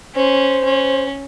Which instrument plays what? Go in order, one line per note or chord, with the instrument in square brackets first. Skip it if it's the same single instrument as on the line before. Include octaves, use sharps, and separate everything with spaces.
[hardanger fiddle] C#4 [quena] C5
[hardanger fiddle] C#4